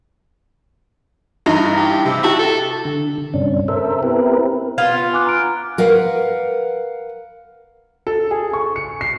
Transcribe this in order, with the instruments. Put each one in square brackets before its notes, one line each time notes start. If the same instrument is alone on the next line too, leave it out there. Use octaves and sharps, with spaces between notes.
[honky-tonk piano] G2 E3 D#4 [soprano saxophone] A#5
[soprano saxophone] G4
[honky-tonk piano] C3
[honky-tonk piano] E4 G4 A5 [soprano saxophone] F#4
[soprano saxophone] A4
[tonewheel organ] D3
G2 C3 C#4 D4
A4 A#4 C5 E5
B3 C4 E4 G4 A#4 B4
[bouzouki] B3 F4 [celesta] G#6
[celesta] G#5 D6 F#6
A#5 F6 D7
[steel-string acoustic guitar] A#4 B4 F5 F#5
[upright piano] A4
G#4
C#6
C#7
C7